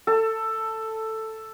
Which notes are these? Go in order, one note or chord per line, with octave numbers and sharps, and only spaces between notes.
A4